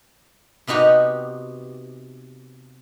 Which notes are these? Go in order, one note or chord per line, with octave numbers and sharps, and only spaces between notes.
C3 B3 D#4 F#4 G4